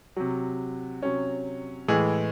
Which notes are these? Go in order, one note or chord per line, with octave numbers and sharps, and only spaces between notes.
C3 F#3
C3 F#3 C#4
A2 E3 G#3 G#4